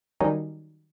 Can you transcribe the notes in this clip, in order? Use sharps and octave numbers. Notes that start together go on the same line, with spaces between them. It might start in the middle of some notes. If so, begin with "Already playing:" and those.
D#3 F#3 G3 C#4 D#4